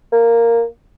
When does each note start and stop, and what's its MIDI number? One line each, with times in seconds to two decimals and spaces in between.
0.13 0.64 58